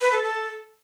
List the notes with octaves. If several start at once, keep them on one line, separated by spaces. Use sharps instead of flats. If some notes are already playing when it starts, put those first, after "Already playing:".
B4
A4
A4